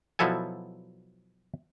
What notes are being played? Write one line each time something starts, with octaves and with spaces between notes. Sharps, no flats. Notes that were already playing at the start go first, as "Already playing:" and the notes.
B2 F3 F#3 E4 A4 G#5